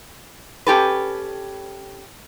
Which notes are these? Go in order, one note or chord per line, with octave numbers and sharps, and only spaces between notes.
C#4 G4 A4 B4